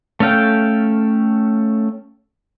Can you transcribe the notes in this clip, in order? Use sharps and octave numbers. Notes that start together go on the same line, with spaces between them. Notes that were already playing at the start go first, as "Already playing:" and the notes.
A3 C#4 A4 F5 G5